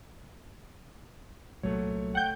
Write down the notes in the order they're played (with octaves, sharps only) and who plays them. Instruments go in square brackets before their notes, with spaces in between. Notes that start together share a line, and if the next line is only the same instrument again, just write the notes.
[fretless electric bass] C2 A#2 F#3 [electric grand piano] A3 C#5
[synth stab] F#5 G6 [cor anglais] G5